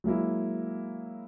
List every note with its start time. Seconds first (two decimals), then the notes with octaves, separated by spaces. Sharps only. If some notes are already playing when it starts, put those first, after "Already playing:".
0.04 F#3 G#3 A#3 E4